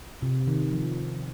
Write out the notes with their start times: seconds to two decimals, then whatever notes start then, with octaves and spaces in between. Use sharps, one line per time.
0.22 C3
0.47 D#3
0.71 F3